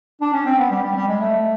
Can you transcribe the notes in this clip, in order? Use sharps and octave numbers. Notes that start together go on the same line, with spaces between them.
D4
C#4
C4
B3
G3
G3
G3
G#3
A3